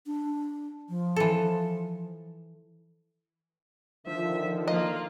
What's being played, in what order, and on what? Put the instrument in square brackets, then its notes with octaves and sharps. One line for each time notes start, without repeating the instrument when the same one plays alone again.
[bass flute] D4
F3
[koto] E3 A4
[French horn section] D3 D#3 [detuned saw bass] F3 [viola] E5
[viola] A#3 F4 [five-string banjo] D#5